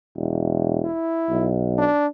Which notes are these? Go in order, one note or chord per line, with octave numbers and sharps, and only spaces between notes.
E1
E4
B1
D4